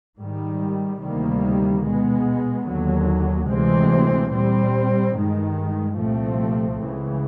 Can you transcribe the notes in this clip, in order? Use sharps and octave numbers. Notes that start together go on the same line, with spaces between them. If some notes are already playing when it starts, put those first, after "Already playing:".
G#2 D#3 G3
D2 C3 D#3 G3 A#3
B2 G#3 B3
D#2 D3 F#3
D2 C3 E3 G#3 C4
A#2 G3 C4
G2 D#3 G#3
C2 A#2 F3 A3 C4
C#2 C#3 E3